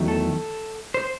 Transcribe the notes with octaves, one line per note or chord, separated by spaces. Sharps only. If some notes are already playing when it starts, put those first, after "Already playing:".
Already playing: E2 D#3 F#3 A3
A4
C5